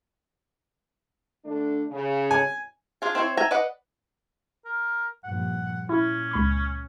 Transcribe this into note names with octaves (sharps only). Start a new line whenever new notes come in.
D3 A3 D4
C#3
G#5
D4 F4 G#4
C4 E4 C5 C#5
E5 G5 G#5 A#5
B4 D5 D#5 F#5
A#4
G2 A#2 F3 F#5
A#2 C#4 E4
C#2 B5 C#6